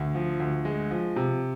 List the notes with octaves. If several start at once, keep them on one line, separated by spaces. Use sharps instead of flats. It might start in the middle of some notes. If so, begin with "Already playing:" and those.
Already playing: D2
F3
D2
G#3
F3
C3